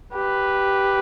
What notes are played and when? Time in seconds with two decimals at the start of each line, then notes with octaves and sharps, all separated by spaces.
0.13 G4 B4